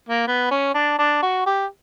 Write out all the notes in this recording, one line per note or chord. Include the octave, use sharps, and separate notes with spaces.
A#3
B3
C#4
D4
D4
F#4
G4